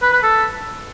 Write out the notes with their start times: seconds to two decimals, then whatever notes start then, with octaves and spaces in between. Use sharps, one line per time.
0.02 B4
0.13 B4
0.23 A4